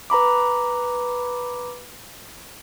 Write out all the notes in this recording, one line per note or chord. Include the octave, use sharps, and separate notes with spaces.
B4 A#5 B5 D6